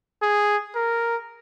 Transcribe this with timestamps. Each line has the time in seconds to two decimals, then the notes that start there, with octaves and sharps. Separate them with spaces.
0.22 G#4
0.75 A#4